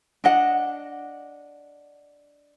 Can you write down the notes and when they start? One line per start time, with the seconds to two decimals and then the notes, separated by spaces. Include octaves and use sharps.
0.24 D4 D#5 F#5